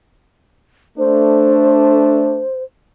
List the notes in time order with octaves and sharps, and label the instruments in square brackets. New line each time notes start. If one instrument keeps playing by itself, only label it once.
[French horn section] A3 D4 [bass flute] C5